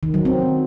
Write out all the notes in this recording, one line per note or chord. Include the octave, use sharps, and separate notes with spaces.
D#3
F#3
C4